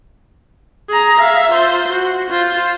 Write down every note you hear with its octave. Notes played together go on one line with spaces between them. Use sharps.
G#4 A#5
E5 F5
F4 C5
F#4
F4 C5